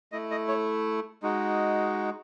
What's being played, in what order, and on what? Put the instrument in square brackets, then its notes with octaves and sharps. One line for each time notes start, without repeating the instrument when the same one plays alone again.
[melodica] A3 E4 D#5
D#5
C#5
G#3 D#4 F#4